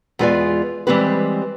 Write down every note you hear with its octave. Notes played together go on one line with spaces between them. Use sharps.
E2 G#3 F4 B4 D5 G#5
E3 G3 G#3 C4 G4 B4